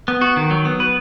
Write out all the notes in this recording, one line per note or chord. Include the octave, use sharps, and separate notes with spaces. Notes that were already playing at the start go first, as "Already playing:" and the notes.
B3
F#4
D#3
F#3
B3
B4